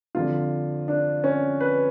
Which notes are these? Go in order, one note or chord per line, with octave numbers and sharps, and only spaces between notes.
F2 D3 F3 F4
D4
C#4
B4